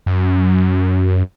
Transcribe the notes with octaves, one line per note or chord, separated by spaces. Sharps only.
F#2